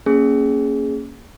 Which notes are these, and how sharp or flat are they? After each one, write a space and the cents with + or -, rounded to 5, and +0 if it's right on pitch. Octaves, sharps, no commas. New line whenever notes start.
A#3 +0 C#4 +0 G#4 +0